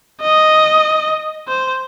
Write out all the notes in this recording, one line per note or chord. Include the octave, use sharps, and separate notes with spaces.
D#5
C5